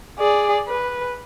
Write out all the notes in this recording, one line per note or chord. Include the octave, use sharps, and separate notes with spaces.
G#4 D5
B4